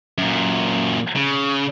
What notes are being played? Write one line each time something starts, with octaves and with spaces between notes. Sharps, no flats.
F#2 A#2
C#3